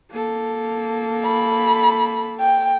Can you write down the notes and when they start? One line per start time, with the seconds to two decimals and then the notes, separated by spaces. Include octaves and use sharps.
0.11 A#3 A4
1.26 B5
2.40 G5